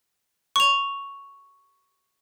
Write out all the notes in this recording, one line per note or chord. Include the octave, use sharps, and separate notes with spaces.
C#6 F7